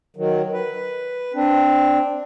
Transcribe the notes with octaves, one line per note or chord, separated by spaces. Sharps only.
D#3 F#3
B4
C4 D4